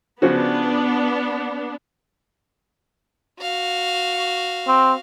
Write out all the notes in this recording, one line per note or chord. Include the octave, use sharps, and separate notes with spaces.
C#3 F3 B3 D4 F#4
F#4 F5
C4